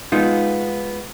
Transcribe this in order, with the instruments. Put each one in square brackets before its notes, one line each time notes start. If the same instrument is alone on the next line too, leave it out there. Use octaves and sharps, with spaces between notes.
[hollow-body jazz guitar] G#3 B3 D#4 F4